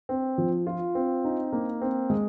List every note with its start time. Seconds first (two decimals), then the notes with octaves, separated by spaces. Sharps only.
0.09 C4
0.38 F3
0.67 F4
0.95 C4
1.24 D#4
1.52 A#3
1.81 C4
2.10 G#3